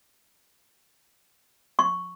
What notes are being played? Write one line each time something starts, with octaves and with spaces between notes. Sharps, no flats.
C#6